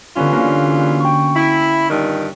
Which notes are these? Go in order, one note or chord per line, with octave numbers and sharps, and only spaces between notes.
D3 E3 G3 B3 C#4 F4
A#3 F#4
G5 C#6
E4 B6 D7
G2 A#2 D#3